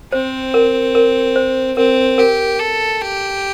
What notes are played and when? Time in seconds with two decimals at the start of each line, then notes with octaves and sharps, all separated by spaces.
0.12 C4 C5
0.54 A#4
0.95 A#4
1.36 C5
1.77 C4 A#4
2.18 G4 A#4
2.60 A4
3.01 G4